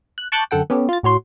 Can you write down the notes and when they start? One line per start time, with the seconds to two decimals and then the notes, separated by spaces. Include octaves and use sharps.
0.18 F#6
0.32 A5 C#6 D6 F#6 G6 A6
0.51 F#2 D3 A4 F#5 G5
0.70 B3 C#4 G4 A4
0.89 F4 A6
1.03 A2 F#4 C#5 C6